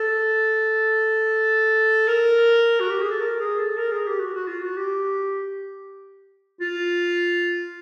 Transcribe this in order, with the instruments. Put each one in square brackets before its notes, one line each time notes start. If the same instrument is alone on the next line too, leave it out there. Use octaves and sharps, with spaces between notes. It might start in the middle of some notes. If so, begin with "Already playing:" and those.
Already playing: [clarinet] A4
A#4
F#4
G4
G#4
A4
A#4
G#4
A4
A#4
G#4
G4
F#4
F#4
F4
F#4
G4
F4